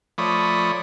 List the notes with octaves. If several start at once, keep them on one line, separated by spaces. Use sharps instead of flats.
F3 A3 C#5 D5 B5 D#6